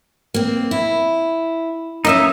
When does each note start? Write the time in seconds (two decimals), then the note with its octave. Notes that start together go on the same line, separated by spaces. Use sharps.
0.34 A#3 C4
0.71 E4
2.05 A#3 C4 C#4 D#4 D#5 E5